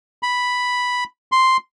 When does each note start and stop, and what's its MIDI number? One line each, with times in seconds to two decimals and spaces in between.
0.23 1.04 83
1.32 1.57 84